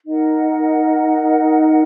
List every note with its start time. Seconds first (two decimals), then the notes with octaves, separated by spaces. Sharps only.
0.05 D#4 A#4 D#5 F#5